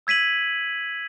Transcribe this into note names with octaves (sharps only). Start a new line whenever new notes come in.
E6 G#6 B6 D#7 F#7